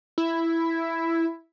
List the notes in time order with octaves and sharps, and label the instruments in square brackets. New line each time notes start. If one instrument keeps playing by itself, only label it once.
[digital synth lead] E4